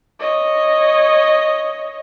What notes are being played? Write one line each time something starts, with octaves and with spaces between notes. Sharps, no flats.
C#5 D#5